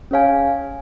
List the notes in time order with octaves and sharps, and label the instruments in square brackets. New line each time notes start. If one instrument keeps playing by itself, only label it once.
[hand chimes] C#4 G#4 C#5 F5 G#5